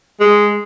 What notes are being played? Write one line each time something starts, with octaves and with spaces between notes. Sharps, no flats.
G#3